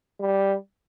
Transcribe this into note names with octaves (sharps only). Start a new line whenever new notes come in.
G3